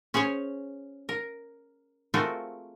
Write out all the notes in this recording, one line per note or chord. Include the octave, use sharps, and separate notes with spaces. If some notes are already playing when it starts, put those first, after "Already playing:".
C#4 G#4 C5 C#5
A#4
A3 C4 F4 F#4 G#4 A#4